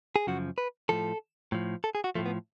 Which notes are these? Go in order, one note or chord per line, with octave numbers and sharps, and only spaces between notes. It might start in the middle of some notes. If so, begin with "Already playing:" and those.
G#4
F#2 C#3 F3 F#4
B4
A2 F3 A4
A2 F3
A4
G#4
F#4
A2 F3 A3
B3